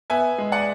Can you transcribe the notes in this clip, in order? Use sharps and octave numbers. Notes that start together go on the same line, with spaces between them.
B3 E5 G#5
G#3
D5 F#5